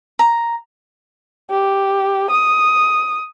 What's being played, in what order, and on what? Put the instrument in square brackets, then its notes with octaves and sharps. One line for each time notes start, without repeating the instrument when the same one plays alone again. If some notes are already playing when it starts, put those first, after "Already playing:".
[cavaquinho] A#5
[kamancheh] G4
D#6